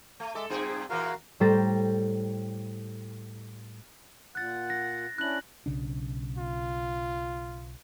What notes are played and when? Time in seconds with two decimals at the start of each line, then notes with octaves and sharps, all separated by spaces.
0.20 A3
0.35 G#3 A4 E5 D6
0.50 G2 A#2 C4 G#4
0.90 A#2 E3 A#3 F#4 A#4 F5
1.40 A2 G3 C5 G5 A#5 A6
4.35 A#2 F#5 F#6 A6
4.70 A#6
5.18 C#4 D4 E4 F#6 F#7
5.66 B1 C#3 D4
6.38 F4